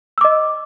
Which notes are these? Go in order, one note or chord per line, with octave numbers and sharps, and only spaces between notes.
D#5 D6 E6